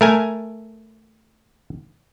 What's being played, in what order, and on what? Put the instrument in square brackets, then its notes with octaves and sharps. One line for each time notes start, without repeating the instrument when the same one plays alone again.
[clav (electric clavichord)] A3 A#4 G#5